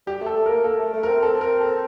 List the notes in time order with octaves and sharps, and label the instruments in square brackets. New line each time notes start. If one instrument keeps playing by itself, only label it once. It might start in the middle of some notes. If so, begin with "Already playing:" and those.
[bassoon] G3 [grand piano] G4
[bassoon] A3
[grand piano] A4
[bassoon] A3
[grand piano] A#4
[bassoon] A#3
[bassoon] A#3 [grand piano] A4
[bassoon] A3
A3
[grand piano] A#4
[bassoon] C4
[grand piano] A4
A#4
A4